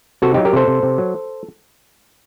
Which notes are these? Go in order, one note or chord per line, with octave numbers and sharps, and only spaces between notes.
C3 F#4 A4
F#3 D#4 G4
G4 A#4
C3 A4 C5
C3
C3
F#3